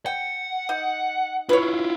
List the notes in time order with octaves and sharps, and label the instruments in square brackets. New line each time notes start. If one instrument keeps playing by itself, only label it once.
[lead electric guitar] F#5 [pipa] G5
[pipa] D#4
[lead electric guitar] E4 F4 [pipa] B4 C#5